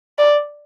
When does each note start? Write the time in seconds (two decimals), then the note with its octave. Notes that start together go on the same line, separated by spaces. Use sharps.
0.19 D5